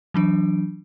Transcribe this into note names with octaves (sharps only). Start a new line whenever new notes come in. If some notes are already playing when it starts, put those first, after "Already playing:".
E3 F#3 D4 D7